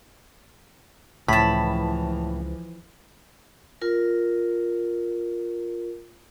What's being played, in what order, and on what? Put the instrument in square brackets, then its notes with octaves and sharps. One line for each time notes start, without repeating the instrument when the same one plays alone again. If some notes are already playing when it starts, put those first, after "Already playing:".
[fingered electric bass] C#2 [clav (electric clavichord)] A2 [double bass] E3 F3 [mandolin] A5 B5
[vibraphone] F4 A#4